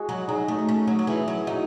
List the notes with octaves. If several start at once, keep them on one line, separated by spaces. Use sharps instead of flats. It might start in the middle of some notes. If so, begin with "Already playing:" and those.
Already playing: G#3 F#4
F#3
F#3 D#4 G#4 D#5
A3
A3 C#4
F#3
F#3
E3 E4 G#4
F#3
F#3 D#4